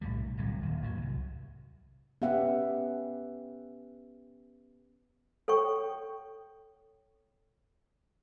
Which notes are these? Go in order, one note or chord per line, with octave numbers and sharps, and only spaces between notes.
B1 A2 C3 G3
D1 C2 A2 F#3
D1 D#2 A#2
G#1 D#2 D#3 F#3
C2
B3 C#4 G4 E5 F#5
A4 C#5 G5 C#6